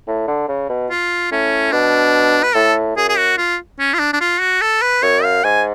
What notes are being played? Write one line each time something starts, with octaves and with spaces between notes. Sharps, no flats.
A2
D3
C#3
B2
F4
A2 C#4
B2 D4
B4
A2 A4
F#2 G#4
G#4
F#4
F4
C#4
F4
D4
D4
F4
F#4
A4
B4
F#2 C#5
F5
G#2 G#5